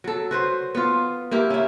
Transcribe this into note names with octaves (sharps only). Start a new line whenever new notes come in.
F#3 A4
F#4 B4 C5
B3 F4
A#3 E4 G4
C#4 E4